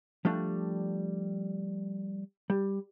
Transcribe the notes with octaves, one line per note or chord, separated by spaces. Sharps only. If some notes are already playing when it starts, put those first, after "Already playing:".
F3 G3 A3 D4
G3